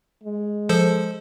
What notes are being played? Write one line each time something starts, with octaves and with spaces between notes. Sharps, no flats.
G#3
F3 A4 C5